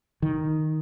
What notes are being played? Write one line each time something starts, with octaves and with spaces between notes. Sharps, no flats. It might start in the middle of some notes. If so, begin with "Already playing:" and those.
D#3